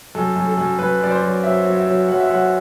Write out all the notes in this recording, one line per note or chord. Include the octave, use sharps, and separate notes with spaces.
F#2 A4
F#2
A4
F#2
F#2 B4
F#2 D5
C5
F#3
F#3 E5
F#3
E5
F#3
F#3 F#5
E5
F#3 F#5